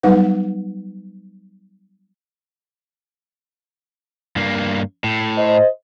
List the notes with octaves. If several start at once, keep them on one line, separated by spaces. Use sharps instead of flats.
F#3 G3 B3 D#4 B4 F#5
G2 A#3
A2
C5 D#5